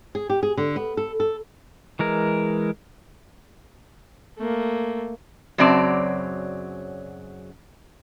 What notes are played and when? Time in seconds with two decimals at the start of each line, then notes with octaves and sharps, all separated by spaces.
0.15 G#4
0.30 G4
0.43 G#4
0.57 D3
0.76 B3
0.97 A4
1.20 A4
1.99 E3 G#3 A#4
4.38 A3 A#3
5.58 F#2 C#3 F#3 C4 D5 A5